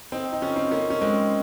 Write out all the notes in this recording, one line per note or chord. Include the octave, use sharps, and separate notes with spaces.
C4 D#4
D#4
C#4 F4
C4 D#4
A#3 C#4
C#4
G#3 C4